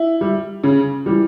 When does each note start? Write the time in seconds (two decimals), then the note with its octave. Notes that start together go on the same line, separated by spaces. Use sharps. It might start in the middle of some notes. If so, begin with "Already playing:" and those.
Already playing: E4
0.21 G3
0.64 C#3
1.06 E3 G3